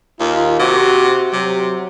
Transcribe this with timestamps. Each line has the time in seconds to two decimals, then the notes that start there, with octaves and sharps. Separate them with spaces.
0.20 D#2 F4
0.59 C3 F#4
1.33 C3 F#3